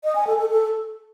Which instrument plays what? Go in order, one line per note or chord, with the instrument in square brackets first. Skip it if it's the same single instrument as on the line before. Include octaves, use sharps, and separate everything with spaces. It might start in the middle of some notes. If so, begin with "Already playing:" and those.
[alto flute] D#5
G#5
A4
A4
A4